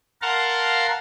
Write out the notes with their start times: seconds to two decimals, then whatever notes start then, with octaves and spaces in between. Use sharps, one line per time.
0.22 A#4 F5 F#5 A5 A#5 C6